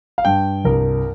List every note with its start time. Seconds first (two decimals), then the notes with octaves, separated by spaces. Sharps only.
0.18 F5
0.25 G2 G5
0.65 C2 A#4